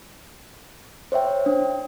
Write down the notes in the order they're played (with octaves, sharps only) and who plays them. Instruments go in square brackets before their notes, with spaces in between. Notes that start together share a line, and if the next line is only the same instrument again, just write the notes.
[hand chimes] C5 C#5 E5 G5
D4